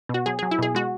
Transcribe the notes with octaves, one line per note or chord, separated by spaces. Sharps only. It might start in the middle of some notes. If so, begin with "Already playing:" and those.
B2 F#4
F#3 G#4
F#3 G#4
E4
B2 G#4
G#3 F#4